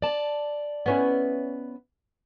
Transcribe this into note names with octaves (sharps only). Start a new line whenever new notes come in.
D5 A5
B3 C#4 E4